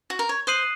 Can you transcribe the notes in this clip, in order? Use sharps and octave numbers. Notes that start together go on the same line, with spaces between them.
F#4
A#4
C#5
C5 D#6 F#6 C7 D#7 F#7